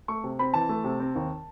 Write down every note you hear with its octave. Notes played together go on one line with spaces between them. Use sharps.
A3 C#6
C3
C4 B5
E3 A5
A3
C3
C4
D#2